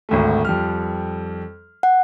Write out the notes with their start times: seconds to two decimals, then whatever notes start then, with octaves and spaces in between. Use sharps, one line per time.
0.09 G#1 D2 A3
0.45 F2 G3 F6
1.83 F#5